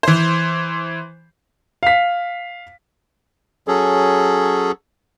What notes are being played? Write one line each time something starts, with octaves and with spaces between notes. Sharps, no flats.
E3 C5
F5 B6
F#3 C#4 G#4 A4